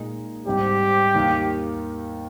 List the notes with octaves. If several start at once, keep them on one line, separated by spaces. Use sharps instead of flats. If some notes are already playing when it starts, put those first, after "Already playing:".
Already playing: A#2 G#3 D#4 G#4
G#2 G3 C4 G4
D#2 D#3 A#3 D#4